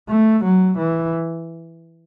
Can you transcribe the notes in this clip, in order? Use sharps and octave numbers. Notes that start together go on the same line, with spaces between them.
A3
F#3
E3